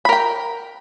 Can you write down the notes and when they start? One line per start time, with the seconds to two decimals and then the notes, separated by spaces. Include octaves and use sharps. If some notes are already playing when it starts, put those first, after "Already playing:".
0.05 B5
0.09 A#4
0.13 G5